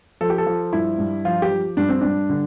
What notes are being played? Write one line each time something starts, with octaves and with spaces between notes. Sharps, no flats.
F3 A4
G4
A4
F3
G2 E4
G2
F3 F4
G4
F3
G2 D4
C4
G2 D4
D3